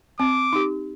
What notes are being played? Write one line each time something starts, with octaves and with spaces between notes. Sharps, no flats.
C4 D6
D#4 G4